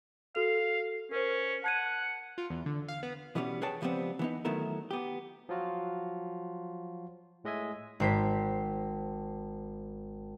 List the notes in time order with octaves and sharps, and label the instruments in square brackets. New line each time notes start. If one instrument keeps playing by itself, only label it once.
[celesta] F#4 A4 F7 [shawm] F5
[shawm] C#4 [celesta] A#4 C5
[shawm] F#5 [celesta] A5 G#6 D#7
[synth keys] F4
E2
D3
F5
B3
[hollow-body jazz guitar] B2 E3 G3 B3 C#4
G#4 B4 C#5 G5 A5
C#2 F3 G3 B3 C4
E3 B3 D#4
D#3 F#3 A3 B3 E4 A#4
B3 G4
[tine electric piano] F3 F#3 F4 F#4
A2 G#3 D#5 E5 G#5
[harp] G#1 C5 B6